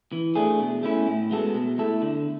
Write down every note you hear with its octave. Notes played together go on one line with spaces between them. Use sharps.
E3
A3 D4 G#4
B2
A3 C#4 E4
A2
G#3 B3 F#4 A4
B2
A3 E4 A4
D3